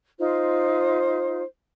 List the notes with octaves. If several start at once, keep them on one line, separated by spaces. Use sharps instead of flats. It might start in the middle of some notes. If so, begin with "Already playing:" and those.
D#4 F4 C5